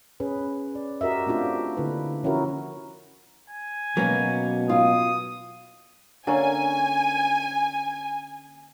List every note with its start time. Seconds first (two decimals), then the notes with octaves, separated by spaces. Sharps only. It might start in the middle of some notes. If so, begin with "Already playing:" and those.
0.20 C#4 G#4 B4
0.75 D5
1.01 F#4 G4 A#4 D#5 E5
1.27 A3 C4 D4 F4 G4
1.77 D3 A#3 E4 B4
2.24 F3 C#4 E4 F#4 A#4
3.50 G#5
3.97 B2 F#3 A#3 B3 C#4
4.69 F4 D#6
6.27 D3 A#3 C#4 G#5